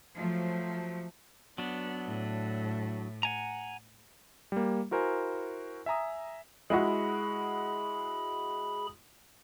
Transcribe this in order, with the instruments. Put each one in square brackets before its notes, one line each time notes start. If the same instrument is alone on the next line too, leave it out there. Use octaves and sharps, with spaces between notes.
[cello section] F3 F#3 A3
[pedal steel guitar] F#3 D4 [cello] B3
[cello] A2
[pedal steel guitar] F#5 G#5 A#5
[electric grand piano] G3 A#3
E4 F#4 A#4 C5 G#5
E5 G#5 A#5 D#6
[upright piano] G#3 E4 F#4 [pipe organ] G#4 B5